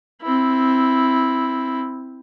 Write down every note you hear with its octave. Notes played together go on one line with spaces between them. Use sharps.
C4 E4